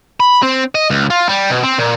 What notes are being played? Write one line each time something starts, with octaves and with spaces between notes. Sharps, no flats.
B5
C4
D#5
C#2
F4
G3
B2
C4
A#2